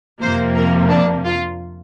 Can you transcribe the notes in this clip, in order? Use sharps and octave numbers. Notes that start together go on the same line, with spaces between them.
F2 C3 F3 A#3 C5
A#4
D4
F4